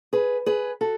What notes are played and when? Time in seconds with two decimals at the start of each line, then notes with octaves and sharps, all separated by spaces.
0.13 G#4 B4
0.46 G#4 B4
0.81 F#4 A4